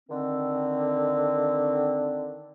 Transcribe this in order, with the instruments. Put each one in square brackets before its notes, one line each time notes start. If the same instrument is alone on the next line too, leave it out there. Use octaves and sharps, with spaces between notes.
[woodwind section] D3 D#3 C4